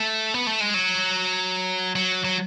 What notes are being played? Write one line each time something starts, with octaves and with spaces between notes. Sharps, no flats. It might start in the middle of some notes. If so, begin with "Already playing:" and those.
Already playing: A3
B3
A3
G#3
F#3
F#3
F#3